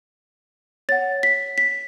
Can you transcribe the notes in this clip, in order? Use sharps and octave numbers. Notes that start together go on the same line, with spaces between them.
C#5 F#5 A6
B6
B6